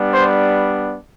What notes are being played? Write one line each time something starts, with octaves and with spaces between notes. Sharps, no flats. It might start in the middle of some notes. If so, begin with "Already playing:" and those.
Already playing: G3 B3 D4
C5